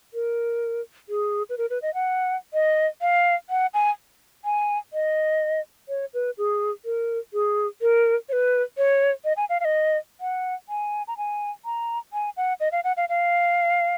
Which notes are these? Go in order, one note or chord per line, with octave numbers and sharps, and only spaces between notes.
A#4
G#4
B4
A#4
B4
D#5
F#5
D#5
F5
F#5
G#5
G#5
D#5
C#5
B4
G#4
A#4
G#4
A#4
C#5
B4
C#5
D#5
G#5
F5
F5
D#5
F#5
G#5
A#5
G#5
A#5
G#5
F#5
D#5
F5
F#5
F5
F5